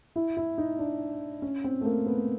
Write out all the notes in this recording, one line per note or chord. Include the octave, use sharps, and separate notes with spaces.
E4
E4
D#4
D4
C#4
C4
A3
A#3
B3